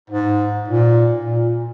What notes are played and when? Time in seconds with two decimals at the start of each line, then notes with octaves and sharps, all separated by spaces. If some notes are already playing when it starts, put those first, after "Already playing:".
0.10 G#2
0.68 A#2
1.25 A#2